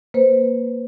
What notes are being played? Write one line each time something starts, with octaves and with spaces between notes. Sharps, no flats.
A#3 B4 C5